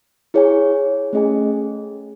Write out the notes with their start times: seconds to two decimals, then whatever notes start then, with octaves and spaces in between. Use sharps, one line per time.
0.34 E4 G#4 C#5 G#5
1.13 A3 C#4 G#4 D#5 G#5